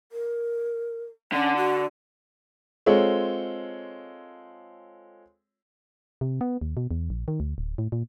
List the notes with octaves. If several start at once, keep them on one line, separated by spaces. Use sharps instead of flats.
A#4
D3 C#4
F#4
G#3 C4 F4 A4 C#5
C3
B3
D#2
B2
E2
A#1
D#3
D2
D1
A2
A#2